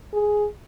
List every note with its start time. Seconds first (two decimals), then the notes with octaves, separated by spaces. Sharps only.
0.13 G#4